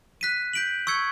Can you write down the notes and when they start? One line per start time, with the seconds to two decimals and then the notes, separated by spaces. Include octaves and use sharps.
0.21 F#6 B6 D#7
0.53 G6 B6 D7 F#7
0.87 C#6 E6 G#6 C#7